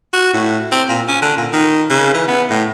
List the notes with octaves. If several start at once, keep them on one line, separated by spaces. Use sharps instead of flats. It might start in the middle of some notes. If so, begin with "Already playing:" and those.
F#4
A2
C4
A#2
C#4
D3
A#2
D#3
C#3
E3
B3
A2